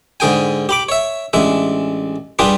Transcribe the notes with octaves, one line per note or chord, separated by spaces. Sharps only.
G#2 D3 G#4 G5 G#5
G4 B5 D6
C#5 E5
A1 G#3 D4 E5
G3 D4 F4 G4 G#4 B4